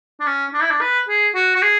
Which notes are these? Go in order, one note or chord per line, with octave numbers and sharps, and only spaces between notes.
D4
C#4
D4
E4
D4
B4
G#4
F#4
F#4
G#4